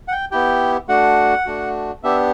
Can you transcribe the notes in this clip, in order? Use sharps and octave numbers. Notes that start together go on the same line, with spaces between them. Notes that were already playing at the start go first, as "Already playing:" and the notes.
F#5
G5
B3 E4 G4 G5
A3 D4 F#4 F#5
A3 D4 F#4
B3 D4 G4 E5